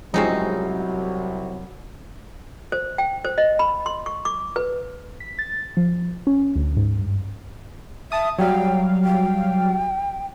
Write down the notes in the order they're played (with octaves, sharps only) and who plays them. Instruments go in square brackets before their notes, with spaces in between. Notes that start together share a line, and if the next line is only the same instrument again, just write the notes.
[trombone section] C2 [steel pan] F3 G#3 G#4 [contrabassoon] F#3 [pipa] C4 C#4 D#4
[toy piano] C5
G5
C5
D#5
B5
C6
C#6
D6
B4
[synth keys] B6
A6
F3
C#4
D2
G#2
G2
[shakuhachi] E5 [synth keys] A5 D#6
[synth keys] F#3 G3 F5 [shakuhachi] G5
[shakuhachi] G5